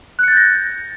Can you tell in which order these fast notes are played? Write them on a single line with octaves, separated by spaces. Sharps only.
F#6 C#7 A6 G6 A#6